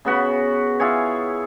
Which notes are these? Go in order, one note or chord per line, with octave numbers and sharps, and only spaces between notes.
C#3 B3 F#4 B5
E4 F4 G#4 C#5